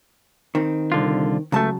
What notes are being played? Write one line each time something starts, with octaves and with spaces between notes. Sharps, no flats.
D#3 C4
C2 D3 F4
C#2 C#3 F#3 A3 A5